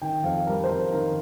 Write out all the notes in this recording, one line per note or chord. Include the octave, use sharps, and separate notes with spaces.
D#3 G5
F2 F5
G3 A#4
C5
F2 A#4
D#3 A#4